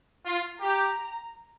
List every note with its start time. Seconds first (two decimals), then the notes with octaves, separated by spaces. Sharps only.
0.26 F4
0.60 G4 A#5